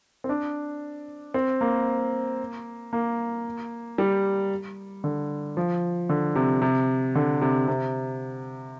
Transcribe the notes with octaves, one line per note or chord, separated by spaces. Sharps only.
C4
D4
C4
A#3
A#3
G3
D3
F3
D3
C3
C3
D3
C3
C3